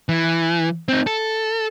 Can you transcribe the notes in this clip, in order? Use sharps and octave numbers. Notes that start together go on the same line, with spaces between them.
E3
C4 D#4
A4